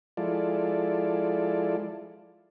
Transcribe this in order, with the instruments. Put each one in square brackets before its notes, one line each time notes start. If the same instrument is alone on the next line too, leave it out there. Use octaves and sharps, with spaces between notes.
[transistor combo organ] F3 G#3 E4 F4 A4 D5